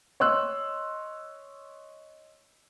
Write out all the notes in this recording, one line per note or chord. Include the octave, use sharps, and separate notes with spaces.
C#5 D#5 C6 E6 F#6